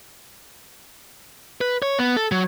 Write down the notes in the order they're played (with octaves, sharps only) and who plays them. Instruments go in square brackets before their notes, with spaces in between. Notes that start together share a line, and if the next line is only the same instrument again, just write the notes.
[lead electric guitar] B4
C#5
B3
A4
F#3